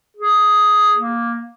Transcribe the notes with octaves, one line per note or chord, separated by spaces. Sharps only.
G#4
A#3